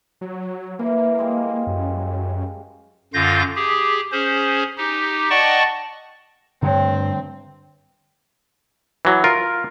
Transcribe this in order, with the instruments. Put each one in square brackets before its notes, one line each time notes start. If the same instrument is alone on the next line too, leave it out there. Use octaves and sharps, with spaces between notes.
[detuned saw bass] F#3
[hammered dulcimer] E3 [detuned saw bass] A#3
[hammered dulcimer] G3 G#3 F5
[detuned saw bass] F#2
[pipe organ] F#2 D3 F4 F5 G6 A#6
G4 G#4
C#4 G#4 C5
D#4 G4
D5 D#5 F#5 G5 A5 C#6
[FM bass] G2 [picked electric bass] D3 G3 A3 [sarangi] C4 [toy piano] C#5 G5 A#5
[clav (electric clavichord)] E3 F#3
F4 A#4